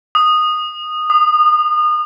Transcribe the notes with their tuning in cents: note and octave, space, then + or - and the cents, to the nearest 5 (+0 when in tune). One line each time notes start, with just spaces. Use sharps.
D#6 -10
D#6 -30